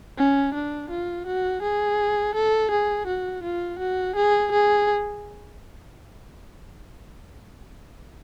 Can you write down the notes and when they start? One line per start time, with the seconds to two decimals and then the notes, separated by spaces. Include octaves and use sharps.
0.18 C#4
0.54 D4
0.90 F4
1.27 F#4
1.63 G#4
2.35 A4
2.71 G#4
3.07 F#4
3.44 F4
3.79 F#4
4.16 G#4
4.52 G#4